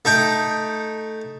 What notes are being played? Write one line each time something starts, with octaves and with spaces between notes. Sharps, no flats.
A3 D#4 G5